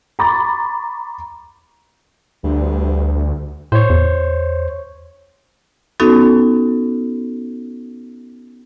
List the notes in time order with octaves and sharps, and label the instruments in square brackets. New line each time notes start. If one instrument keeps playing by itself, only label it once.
[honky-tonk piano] A#5 B5 C#6 D6 A6
[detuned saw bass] D2 [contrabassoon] G2
[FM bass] A2 [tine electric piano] C5 C#5
[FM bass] E2
[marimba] B3 C#4 D#4 F#4 A4